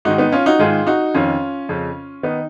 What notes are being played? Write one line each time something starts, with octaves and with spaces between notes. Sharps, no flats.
G#2 D#3 D#4 F#4
B3 D#4
C#4 F4
D#4 F#4
G#2 D#3 F4 G#4
D#4 F#4
F2 D#3 C#4 F4
F2 C#3
D#3 B3 D#4